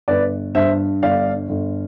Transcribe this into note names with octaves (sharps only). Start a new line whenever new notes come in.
G1 B4 D5
G2 C5 E5
G1 D5 F5
G1